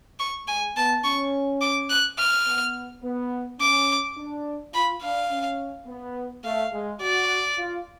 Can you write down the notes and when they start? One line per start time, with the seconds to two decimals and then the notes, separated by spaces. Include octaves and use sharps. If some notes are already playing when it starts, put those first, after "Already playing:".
0.19 C#6
0.47 G#3 G#5
0.76 B3 A5
1.04 C#4 C#6
1.61 D6
1.90 F#6
2.18 F6
2.47 B3
3.03 B3
3.60 C#4 D6
4.17 D4
4.73 F4 B5
5.02 D4 F5
5.31 C#4
5.87 B3
6.44 A3 F5
6.72 G#3
7.00 F#4 D5
7.58 F4